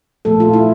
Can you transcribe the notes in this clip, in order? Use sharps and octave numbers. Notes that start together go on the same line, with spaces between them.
A#2 F3 A3 A4
F4
E4